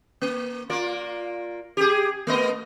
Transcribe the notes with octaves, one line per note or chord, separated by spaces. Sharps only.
A#3
A#3 F4 D5
G4 G#4
A3 B3 D#5